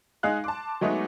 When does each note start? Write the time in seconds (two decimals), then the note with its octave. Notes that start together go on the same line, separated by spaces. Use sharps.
0.23 G#3 D#4 G#4 F5 F#6
0.44 A5 C6 D6
0.81 F#3 G#3 A3 B3 D#4